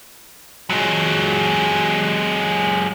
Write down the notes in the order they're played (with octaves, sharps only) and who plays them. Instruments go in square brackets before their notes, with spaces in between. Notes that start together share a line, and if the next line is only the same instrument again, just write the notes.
[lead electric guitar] F#3 G#3